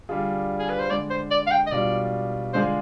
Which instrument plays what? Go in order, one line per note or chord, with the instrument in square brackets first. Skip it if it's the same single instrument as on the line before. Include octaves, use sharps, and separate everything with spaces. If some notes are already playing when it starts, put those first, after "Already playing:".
[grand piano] D3 G3 D4 F4 G#4
[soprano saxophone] G#4
B4
C5
[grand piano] D3 G#3 D4 [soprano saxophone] D5
[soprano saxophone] C5
D5
F5
G5
D#5
[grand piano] B2 G3 D4 F4 [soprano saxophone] D5
[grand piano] D3 G#3 D4 F4 G#4 [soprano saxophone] C5